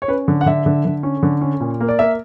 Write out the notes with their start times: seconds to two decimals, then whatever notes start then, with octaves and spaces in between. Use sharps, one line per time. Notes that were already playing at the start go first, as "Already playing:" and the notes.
0.02 C#5
0.08 C#4 B4
0.28 D3
0.41 F#5
0.46 D3 E5
0.66 D3
0.85 D3
1.03 C#4
1.23 D3
1.41 C#4
1.60 A#2
1.80 A#3
1.89 D5
1.99 A#3 E5